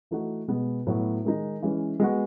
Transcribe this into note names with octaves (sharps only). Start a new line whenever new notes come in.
E3 A3 D#4 F#4
B2 G#3 B3
A2 F#3 B3 F#4
D#3 G#3 D#4
E3 G#3 C#4
G#3 B3 F#4